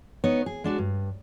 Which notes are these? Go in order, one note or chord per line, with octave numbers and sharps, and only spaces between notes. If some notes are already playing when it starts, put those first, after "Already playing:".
B3 D#4 C#5
G#4
G#3 D4 F#4
G2